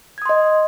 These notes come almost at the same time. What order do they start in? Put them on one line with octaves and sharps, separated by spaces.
G#6 D#6 C6 D#5